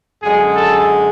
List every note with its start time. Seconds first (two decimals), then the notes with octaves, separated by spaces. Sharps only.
0.23 F#2 D3 G#3 G#4
0.55 A4